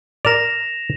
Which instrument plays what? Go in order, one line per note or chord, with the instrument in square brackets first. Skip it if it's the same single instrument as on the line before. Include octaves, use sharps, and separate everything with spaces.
[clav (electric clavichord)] A#4 D5 [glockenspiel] A#6 E7 F7